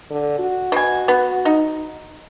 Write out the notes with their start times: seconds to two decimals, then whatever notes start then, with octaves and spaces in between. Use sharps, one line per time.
0.10 D3
0.39 F#4
0.72 B2 G#5
1.08 B3
1.45 D#4